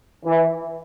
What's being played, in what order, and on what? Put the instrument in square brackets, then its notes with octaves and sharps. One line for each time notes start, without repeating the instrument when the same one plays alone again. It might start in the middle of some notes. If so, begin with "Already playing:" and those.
[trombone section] E3